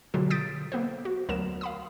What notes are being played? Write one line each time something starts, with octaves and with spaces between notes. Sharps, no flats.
B2 D3 F#3 F4 G4 G#4
D#6 G6 A6 B6 D7
A#3 B3 A4 C5
F#4
D2 F#3 B3 A#4 E7
F5 B5 D#6